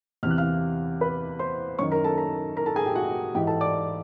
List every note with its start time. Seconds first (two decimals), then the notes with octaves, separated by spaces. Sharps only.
0.23 E2 C3 E3 F6
0.30 F#6
0.38 F5 F6
1.01 B4 B5
1.39 C5 C6
1.79 F#2 D#3 C#5 C#6
1.92 A#4 A#5
2.04 A4 A5
2.17 A#4 A#5
2.56 A#4 A#5
2.66 A4 A5
2.76 G#4 G#5
2.86 G4 G5
2.96 F#4 F#5
3.35 G#2 E3 G4 G5
3.47 A4 A5
3.61 D5 D6